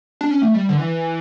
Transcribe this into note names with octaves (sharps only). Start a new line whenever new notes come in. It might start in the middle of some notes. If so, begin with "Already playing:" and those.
D4
C#4
A3
G3
D3
E3